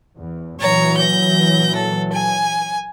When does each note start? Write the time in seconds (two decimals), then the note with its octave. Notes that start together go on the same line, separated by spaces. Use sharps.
0.18 E2
0.60 A#2 E3 F#3 C#5 A#5
0.97 G6 A#6
1.75 A4
2.12 G#5